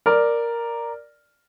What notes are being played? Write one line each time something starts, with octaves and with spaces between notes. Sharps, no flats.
A#4 D5